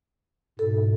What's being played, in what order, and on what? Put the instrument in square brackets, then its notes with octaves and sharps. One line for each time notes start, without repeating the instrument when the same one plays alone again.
[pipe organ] G#2 B2 [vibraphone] A4